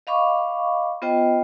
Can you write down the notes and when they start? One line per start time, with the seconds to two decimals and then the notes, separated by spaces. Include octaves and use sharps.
0.07 D#5 F5 B5 C#6 D6
1.02 B3 F4 C5 D#5 G5